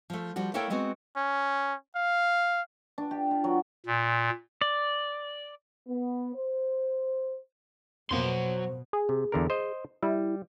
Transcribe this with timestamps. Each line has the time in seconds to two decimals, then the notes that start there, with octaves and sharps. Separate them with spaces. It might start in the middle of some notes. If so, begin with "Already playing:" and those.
0.10 F3 A3
0.36 F3 G3 F#4
0.54 A3 A#3 E4 A4 C#5 G5
0.70 G#3 B3 C4 F#4
1.17 C#4
1.96 F5
2.98 D4
3.11 G4
3.31 F4
3.44 F#3
3.86 A#2
4.61 D5
5.87 B3
6.35 C5
8.11 F2 B2 F#3 A#3 B3 C5 C6
8.93 G#4
9.09 C3
9.32 E2 D3 A#4
9.50 C5 D#5
10.02 G3 E4